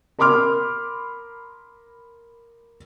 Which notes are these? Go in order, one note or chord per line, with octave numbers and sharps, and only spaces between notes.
A#4 B5 C6 D6 F6